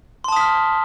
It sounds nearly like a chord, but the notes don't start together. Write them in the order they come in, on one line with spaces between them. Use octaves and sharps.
C6 A5 D#6 B6 F6